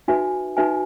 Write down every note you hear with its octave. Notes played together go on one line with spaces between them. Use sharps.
D#4 F#4 B4 E5 G#5
D#4 F#4 B4 E5 G#5